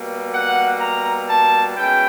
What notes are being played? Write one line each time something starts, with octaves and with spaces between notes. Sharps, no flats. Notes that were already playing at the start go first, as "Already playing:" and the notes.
Already playing: B2 G3 A#3
F#5
A#5
A5
B2 G#3 C#4 E4 G5